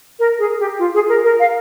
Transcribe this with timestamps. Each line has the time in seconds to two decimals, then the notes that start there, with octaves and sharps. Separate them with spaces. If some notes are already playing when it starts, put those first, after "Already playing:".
0.19 A#4
0.39 G#4
0.59 G4
0.79 F4
0.94 G#4
1.09 A#4
1.24 A#4
1.39 F5